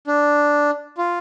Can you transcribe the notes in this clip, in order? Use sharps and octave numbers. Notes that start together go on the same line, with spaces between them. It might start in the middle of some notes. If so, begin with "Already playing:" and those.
D4
F4